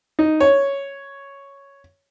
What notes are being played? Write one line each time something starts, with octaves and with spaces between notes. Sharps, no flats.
D#4
C#5